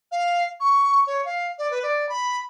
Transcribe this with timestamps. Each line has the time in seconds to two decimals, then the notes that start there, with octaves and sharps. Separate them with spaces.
0.12 F5
0.60 C#6
1.07 C#5
1.25 F5
1.58 D5
1.71 B4
1.83 D5
2.09 B5